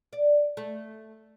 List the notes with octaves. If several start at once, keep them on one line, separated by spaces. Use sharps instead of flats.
D5
A3